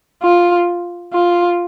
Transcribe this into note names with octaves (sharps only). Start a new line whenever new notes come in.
F4
F4